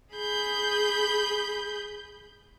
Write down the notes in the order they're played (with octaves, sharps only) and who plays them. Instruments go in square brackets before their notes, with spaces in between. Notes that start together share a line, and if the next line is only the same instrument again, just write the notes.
[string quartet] G#4 B5 G6